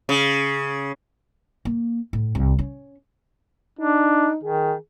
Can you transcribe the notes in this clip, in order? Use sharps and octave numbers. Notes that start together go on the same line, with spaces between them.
C#3
A#3
A2
C2
C#4
D4 D#4
D#3 G#4